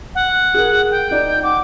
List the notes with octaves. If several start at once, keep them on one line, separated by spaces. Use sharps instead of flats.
F#5
G#4 A#4
G5
D#4 D5
F#5 D6